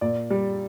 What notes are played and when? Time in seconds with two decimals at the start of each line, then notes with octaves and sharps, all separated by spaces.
0.01 A#2 D5
0.30 G3